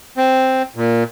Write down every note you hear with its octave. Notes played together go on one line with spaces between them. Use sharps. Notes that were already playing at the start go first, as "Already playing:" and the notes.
C4
A#2